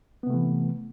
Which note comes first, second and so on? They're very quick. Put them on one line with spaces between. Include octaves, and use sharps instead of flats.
B3 C3 A3 E3